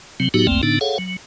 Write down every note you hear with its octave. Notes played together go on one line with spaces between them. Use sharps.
C3 F#3 C4
A2 F#3 B3 D#4 F#4 G4
G1 C2 F2 A3 A#3 C4
A2 D3 B3 D4 D#4
G#4 A4 C#5 F5 F#5
F#3